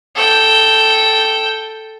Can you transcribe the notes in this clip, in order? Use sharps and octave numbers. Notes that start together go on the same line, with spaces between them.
A4 G5